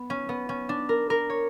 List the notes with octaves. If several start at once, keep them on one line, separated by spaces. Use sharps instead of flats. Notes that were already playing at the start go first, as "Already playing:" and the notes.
Already playing: B3
C#4
B3
C#4
D4
A#4
A#4
C#5